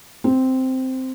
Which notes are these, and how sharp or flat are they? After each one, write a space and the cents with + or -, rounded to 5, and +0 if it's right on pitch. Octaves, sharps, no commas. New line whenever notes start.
C4 -5